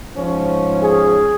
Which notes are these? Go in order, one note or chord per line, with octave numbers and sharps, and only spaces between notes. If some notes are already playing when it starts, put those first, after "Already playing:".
G#2 F3 C#4
G#4